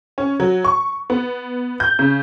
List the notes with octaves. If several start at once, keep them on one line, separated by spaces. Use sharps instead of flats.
C#4
F#3
C#6
B3
G6
C#3